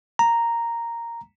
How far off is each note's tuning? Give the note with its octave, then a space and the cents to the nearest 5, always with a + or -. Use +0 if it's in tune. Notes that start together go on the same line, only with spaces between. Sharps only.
A#5 -5